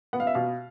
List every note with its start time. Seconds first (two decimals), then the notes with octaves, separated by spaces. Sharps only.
0.13 B3 F#5
0.20 F5
0.27 E5
0.34 B2 F5